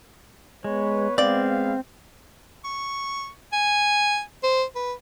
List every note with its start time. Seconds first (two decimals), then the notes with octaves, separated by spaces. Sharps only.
0.64 G#3 B3 B4 C#5
1.18 G#3 B3 C4 D5 F5
2.64 C#6
3.53 G#5
4.43 C5
4.75 B4